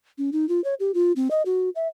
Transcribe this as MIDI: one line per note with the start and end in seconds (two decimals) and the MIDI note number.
0.18 0.30 61
0.33 0.48 63
0.49 0.63 65
0.64 0.74 73
0.80 0.91 67
0.94 1.12 65
1.16 1.28 60
1.31 1.42 75
1.46 1.69 66
1.75 1.87 76